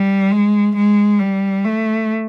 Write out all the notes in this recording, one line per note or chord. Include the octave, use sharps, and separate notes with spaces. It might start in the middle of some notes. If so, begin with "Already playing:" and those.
Already playing: G3
G#3
G#3
G3
A3